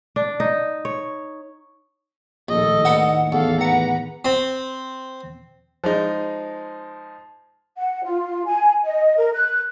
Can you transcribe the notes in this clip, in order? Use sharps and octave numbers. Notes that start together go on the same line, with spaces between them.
D4
D#4
C#5
A#1 D#2 A2 D#3 A4 D#5
D4 D#4 B4 F#5
E2 A4 F5
B4 F#5 A#5
C4
F3 G#3 D#4
F#5
F4
G#5
D#5
A#4
F#6